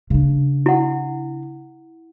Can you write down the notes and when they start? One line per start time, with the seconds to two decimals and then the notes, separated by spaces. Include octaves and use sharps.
0.10 C#3 D4
0.66 E4 F#5